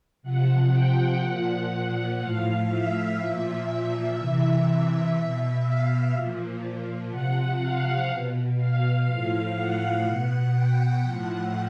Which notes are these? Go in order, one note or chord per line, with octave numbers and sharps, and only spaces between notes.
C3 F3 F#5
G5
A#2 F3 F#5
A2 F3 F5
E5
A#2 F3
C3 E3 E5
B2
F5
A#2 F3
C3 F3 F#5
F5
B2
F5
A2 F3 F5
F#5
B2
G5
A2 F3 F#5